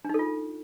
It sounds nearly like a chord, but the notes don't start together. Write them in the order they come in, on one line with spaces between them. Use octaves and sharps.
D4 D#4 A4 F4